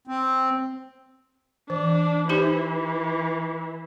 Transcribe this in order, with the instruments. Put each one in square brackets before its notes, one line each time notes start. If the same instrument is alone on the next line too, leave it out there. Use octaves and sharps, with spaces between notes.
[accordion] C4
[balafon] E3 [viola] D4
[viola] E3 [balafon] D#4 G4 C5